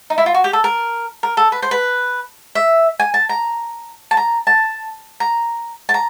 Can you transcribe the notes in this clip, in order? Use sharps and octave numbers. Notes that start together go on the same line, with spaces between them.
D#4
E4
F4
F#4
G4
A4
A#4
A#4
A4
B4
C5
B4
E5
G#5
A5
A#5
A5
A#5
A5
A#5
A5
A#5